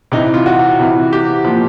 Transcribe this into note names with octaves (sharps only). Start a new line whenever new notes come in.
C3 E3 D#4
F4
F#4
C3 E3
G4
A#2 F3